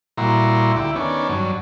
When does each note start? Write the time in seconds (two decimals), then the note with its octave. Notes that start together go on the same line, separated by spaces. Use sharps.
0.18 A#2 G3 E4 F#4 A#5 C6
0.76 D2 E4 G4
0.96 D#3 B3 C#4 D4
1.29 G2 F#3